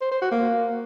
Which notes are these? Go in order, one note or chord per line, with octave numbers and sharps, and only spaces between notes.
C5
C5
F#4
A#3